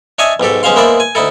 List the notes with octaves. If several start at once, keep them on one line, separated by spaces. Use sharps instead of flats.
D4 C#5 D#5 E5 G#5 A5
B1 G#2 G4 A4
B1 G#3 C#4 C5 F5 C6
G#3 A#3 B3 E4 C5 D5
G#5
D2 D#4 E4 A4